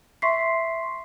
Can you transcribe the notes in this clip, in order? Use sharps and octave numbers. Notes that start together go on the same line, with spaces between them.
E5 C6 C#6 B6 C7